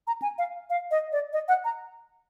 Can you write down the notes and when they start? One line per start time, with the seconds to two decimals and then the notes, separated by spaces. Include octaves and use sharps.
0.07 A#5
0.22 G#5
0.38 F5
0.70 F5
0.91 D#5
1.12 D5
1.33 D#5
1.48 F#5
1.65 A#5